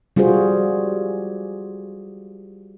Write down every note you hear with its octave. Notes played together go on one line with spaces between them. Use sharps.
G3 F4 F#4 G#4 C5